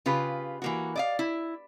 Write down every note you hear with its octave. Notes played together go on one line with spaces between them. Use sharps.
C#3 F4 G4 B4
E3 A#3 F#4
D5 D#5 F5
E4